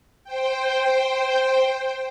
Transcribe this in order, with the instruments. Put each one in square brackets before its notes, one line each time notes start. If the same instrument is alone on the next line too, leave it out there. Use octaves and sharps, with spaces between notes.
[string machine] C5 G5